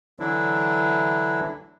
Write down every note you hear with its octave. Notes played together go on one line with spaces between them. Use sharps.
D3 E3 F#3 D4 E4